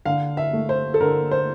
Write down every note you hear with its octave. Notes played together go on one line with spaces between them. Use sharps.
D3 F5
E5
A3
C5
A4
D3 A#4
C5